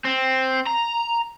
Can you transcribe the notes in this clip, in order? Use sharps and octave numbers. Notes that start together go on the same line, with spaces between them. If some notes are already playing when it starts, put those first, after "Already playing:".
C4
A#5